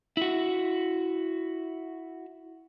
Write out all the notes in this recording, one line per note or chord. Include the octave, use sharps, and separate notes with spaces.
E4 F#4